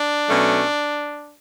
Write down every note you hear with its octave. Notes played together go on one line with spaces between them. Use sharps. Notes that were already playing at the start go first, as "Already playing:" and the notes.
Already playing: D4
B2 F#3 A3 C#4